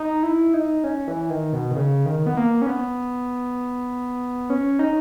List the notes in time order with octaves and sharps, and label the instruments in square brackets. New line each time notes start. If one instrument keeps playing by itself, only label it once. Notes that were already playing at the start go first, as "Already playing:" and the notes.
Already playing: [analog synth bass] D#4
E4
D#4
C#4
E3
D#3
B2
D#3
C#3
D#3
B3
A#3
C#4
B3
C#4
D#4